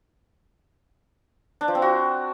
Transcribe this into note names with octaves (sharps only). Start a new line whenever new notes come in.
D4
F3
C4
F#4